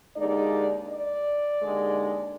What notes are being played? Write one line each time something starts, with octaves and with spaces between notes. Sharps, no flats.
D#2 D3 G#3 D#4 D5
D5
D#2 D3 G#3